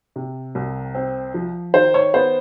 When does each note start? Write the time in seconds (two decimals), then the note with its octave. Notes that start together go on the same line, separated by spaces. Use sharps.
0.16 C3
0.55 C2
0.95 C4
1.34 F3
1.74 D#3 C5
1.94 C#5
2.14 B3 C5